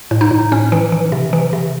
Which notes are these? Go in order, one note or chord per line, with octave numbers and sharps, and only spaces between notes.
A2
D#4
A2
A2 C#4
E3
E3
C3
E3
C3